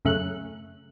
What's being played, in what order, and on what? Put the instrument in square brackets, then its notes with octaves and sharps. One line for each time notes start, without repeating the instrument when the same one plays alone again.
[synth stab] F#2 C#3 A3 F#6